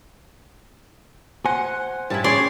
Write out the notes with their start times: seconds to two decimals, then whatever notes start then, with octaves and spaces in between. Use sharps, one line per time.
1.46 C5 F#5 G#5
2.10 G2 G3 E4 A5
2.24 C#4 G#4 C#5 D5 G5 C6